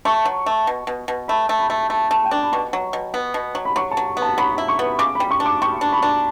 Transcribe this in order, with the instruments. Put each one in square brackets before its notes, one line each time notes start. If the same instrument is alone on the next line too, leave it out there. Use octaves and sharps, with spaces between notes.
[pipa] A3 [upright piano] C#6
[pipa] F#3
A3
B2
B2
B2
[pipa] A3 [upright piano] B5
[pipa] A3
[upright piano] B5
[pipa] A3
[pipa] A3 [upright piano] A5
[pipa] A3
[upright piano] G5
[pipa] D4 [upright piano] A5
[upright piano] B5
[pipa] B2 [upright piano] C#6
[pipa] F#3
B2
B3
B2
F#3
[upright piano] B5
[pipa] F#3 [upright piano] C#6
[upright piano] A5
[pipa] F#3
B3
[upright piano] A5
[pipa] F#3 [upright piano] B5
[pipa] E4
[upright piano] C#6
[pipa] B3
[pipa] C#3 [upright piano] D6
[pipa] G3 [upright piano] B5
[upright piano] C#6
[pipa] D4
[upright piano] D6
[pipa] G3 [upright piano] C#6
[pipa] D4
[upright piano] B5
[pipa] D4